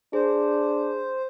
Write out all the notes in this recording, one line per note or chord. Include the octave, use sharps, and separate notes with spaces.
D4 G#4 C5